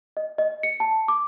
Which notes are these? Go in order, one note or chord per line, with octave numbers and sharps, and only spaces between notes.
D#5
D#5
C#7
A5
D6